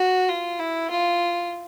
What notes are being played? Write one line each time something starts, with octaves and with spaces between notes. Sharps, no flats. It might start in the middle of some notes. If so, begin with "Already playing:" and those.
Already playing: F#4
F4
E4
F4